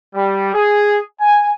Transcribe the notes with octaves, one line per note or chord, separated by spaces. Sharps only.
G3
G#4
G#5